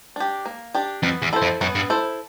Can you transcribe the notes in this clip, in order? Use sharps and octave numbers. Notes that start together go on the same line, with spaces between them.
D4 G4
A#3
D4 G4
F2 B3
E2
E4 A4 C5
F2
F#2 B3
G2
E4 A4 C5